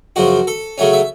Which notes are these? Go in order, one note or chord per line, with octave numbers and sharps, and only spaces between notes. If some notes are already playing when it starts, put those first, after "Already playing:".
F#2 C#3 F3 F#4
A4
C#3 F#3 A3 C#4
E5